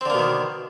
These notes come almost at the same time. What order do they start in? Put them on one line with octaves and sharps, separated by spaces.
C4 D3 A#3 B2 D#3